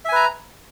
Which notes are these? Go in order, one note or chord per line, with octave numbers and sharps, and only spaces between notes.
B4 E5 G#5 A#5